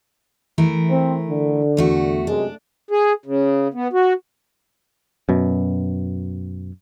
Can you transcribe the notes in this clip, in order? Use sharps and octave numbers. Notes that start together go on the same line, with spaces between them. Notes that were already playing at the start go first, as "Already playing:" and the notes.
E3 A3 A#4
C4
D3
E2 A3 F#4
F#2 C3 G#3 D4
G#4
C#3
B3
F#4
F#2 B2